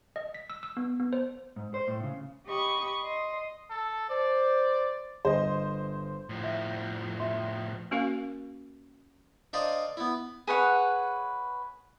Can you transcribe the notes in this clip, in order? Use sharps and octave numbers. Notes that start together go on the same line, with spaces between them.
D#5
B6
E6
E6
B3
B3
C5
G#2
C5
A2
C#3
G4 D#5 B5 C#6
D#5 C6
A4
C5 D5
G1 C5 D#5
A2 F3
E5
E5 C6
A#3 C#4 F#4 A#4 F5 C#6
D4 A#4 C5 D5 D#5 F5
B3 E4
G#4 B4 C#5 F#5